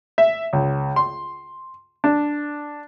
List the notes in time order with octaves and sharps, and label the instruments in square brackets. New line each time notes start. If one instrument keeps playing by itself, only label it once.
[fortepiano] E5
C#2
C6
D4